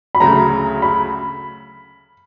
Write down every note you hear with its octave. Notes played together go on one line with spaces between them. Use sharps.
B5
D2 C#3 F#3 A3 A#5
B5